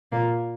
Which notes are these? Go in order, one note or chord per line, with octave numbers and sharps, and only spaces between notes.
A#2 A#3